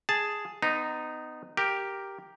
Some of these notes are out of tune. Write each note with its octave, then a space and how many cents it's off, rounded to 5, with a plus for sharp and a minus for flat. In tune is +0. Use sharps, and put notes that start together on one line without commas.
G#4 +0 A5 +0
B3 +30 D#4 -10
G4 +0 A#4 +0